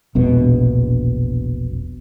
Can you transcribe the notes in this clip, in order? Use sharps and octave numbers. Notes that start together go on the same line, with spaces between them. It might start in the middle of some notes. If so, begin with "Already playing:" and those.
E1 A#1 B2